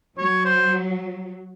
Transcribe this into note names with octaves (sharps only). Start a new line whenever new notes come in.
F#3 C#5
C5